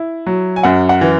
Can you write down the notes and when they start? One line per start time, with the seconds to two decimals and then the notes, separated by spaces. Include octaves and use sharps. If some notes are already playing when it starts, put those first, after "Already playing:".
Already playing: E4
0.26 F#3
0.56 G#5
0.63 F#2 F#5
0.89 F#5
1.01 E3